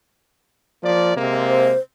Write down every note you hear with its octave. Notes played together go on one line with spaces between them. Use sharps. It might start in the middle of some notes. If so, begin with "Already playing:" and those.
F3 A#3 D5
C3 G#3 A#3
C5